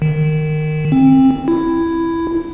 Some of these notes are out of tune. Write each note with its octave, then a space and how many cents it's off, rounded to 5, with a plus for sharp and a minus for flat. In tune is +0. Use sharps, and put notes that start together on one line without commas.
D#3 -20
C4 +25
E4 +10